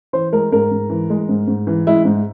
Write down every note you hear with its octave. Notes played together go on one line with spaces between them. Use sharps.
E3 C5
G#3 A#4
G#2 A#4
G#2
E3
G#3
G#2
G#2
E3
G#3 E4
G#2